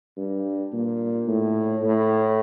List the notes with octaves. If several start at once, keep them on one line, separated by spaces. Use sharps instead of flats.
G2
A#2
A2
A2